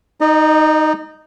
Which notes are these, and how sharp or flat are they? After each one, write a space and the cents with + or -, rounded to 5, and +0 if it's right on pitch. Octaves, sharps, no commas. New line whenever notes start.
D#4 +0 D#5 -40